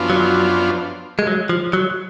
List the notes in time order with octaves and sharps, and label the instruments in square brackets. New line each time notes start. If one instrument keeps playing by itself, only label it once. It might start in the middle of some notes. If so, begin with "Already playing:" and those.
Already playing: [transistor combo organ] F#2 F3 B3 D4 F4
[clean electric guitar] F#3
G#3
F#3
F3
F#3